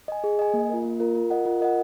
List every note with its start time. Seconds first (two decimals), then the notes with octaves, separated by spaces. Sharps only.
0.08 D#5 G#5
0.24 G#4
0.39 D#5 G#5
0.54 A#3
0.69 F4 A#4
0.85 A#3
1.00 F4 A#4
1.15 F4
1.30 A#4 D#5 F#5
1.45 F4
1.61 A#4 D#5 F#5